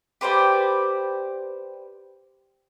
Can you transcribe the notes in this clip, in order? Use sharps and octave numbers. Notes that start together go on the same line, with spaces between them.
G4 B4 C5 D5